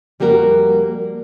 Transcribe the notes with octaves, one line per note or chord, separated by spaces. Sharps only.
F2 G3 A#3 F#4 A#4